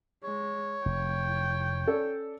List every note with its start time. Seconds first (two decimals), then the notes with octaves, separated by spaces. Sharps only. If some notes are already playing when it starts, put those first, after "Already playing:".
0.24 G#3 C#5
0.86 F1 G5
1.87 C#4 A4 D5